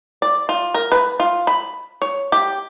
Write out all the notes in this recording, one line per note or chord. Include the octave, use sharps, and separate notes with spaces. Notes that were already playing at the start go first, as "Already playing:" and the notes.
D5
F4
A#4
B4
F4
B5
C#5
G4